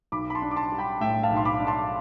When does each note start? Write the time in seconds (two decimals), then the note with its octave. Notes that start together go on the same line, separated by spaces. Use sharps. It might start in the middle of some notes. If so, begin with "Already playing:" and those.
0.12 B1 B5 D6
0.30 B5
0.35 A5 C6
0.42 D4
0.51 D6
0.56 A5 C6
0.72 G3
0.78 G5 B5
1.01 A2 E5 G5
1.23 F5 A5
1.31 B1
1.37 C6
1.45 B5 D6
1.60 D4
1.67 A5 C6